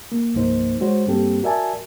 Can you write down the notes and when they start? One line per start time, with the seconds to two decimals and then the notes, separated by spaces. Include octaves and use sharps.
0.12 A#3
0.34 C2 G2 F3 A#3 D#4 C5
0.81 G#3 F#4 C5 C#5
1.07 G2 G3 A#3 C4 G4 A4
1.43 F#4 A#4 D5 E5 G#5 A5